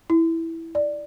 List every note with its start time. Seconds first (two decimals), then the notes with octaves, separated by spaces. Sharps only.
0.10 E4
0.75 D5